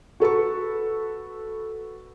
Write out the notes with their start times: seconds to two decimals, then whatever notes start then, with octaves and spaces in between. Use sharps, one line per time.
0.20 F#4 A4 B4 C#6